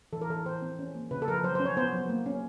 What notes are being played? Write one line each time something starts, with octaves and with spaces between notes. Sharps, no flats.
E3 A4
A#4
E3 A4
E3 C5
C4
C#4
A#3
C#3 B4
A4
F3 A#4 B4
F#3 C5
C5
C#4
C#5
B3 C5
F#3
A#3
C#4